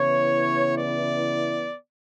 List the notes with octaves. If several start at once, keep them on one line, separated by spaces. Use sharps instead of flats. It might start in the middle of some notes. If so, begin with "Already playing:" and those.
Already playing: C#3 E3 B3 E4 C#5
D5